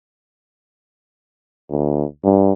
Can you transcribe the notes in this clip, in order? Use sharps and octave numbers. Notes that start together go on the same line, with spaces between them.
D2
G2